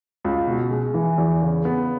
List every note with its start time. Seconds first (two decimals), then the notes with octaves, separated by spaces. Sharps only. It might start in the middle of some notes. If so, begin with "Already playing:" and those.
0.24 C#2
0.47 B2
0.71 G#3
0.94 E3
1.18 E2
1.42 C#3
1.65 B3